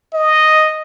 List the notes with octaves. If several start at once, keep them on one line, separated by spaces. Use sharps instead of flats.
D#5